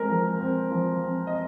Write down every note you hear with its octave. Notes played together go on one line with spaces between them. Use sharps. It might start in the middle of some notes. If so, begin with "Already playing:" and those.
Already playing: G#3 C4 A#4
F3
C4
F3
C4
D#5